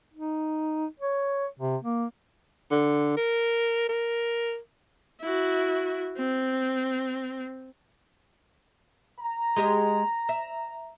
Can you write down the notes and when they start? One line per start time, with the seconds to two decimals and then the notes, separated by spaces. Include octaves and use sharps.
0.14 D#4
1.00 C#5
1.59 C3
1.83 A#3
2.71 D3
3.17 A#4
3.89 A#4
5.21 E4 F#4
6.17 C4
9.19 A#5
9.56 G#3 G4 D#5
10.29 E5